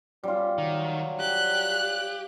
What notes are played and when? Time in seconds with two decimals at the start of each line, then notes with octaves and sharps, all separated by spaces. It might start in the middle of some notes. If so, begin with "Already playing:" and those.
0.23 G3 C#4 F4
0.58 D#3 F#3
1.20 G4 F#6